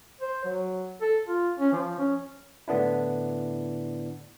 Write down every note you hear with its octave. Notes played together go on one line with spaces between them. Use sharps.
C5
F#3
A4
F4
C#4
F3
C#4
A2 D3 B3 D4 E4